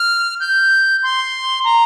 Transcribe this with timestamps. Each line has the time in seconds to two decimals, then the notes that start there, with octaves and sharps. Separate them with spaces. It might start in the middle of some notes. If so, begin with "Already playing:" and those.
Already playing: F6
0.40 G6
1.03 C6
1.64 A#5